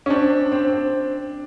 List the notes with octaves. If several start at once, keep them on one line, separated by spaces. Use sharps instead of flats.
C#4
C4 D4
C4
C4